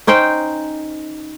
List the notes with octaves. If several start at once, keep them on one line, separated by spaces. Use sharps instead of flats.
C#4 D#4 C5 G5